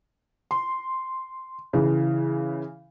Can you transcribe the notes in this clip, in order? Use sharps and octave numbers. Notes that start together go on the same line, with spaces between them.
C6
C#3 E3